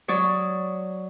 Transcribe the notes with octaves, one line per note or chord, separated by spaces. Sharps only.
F#3 C#5 D5 D#6